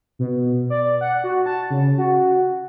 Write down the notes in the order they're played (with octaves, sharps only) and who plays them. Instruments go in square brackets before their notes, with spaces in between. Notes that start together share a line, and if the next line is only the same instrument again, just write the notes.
[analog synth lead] B2
D5
F#5
F#4
A5
C#3
F#4